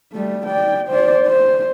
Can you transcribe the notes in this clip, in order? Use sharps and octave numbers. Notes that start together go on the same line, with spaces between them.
G3 A3
D5 G5
C5 D5
C5